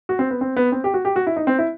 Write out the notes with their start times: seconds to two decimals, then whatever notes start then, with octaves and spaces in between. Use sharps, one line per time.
0.09 F#4
0.19 C4
0.31 B3
0.41 C4
0.57 B3
0.72 C4
0.84 G4
0.94 F#4
1.05 G4
1.16 F#4
1.27 E4
1.36 D#4
1.47 C4
1.59 E4